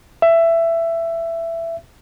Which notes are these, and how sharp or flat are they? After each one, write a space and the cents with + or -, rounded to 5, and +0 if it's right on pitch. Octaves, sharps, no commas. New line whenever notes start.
E5 +15